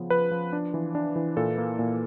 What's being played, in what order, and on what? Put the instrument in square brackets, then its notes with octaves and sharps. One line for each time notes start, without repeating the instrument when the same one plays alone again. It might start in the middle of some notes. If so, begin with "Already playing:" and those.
Already playing: [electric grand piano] C#3 F3 B3
F3 B4
F3
D4
E3
D4
E3
A#2 A4
A#3
A#2